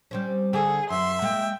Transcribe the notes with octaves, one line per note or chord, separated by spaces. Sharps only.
G3 C4 C#4
D3 G#4 A4
F#2 E5 C6
G#3 A#3 G5